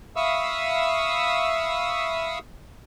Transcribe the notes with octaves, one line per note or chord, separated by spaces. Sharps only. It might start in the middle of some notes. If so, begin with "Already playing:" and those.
E5 F5 B5 C#6 D#6 E6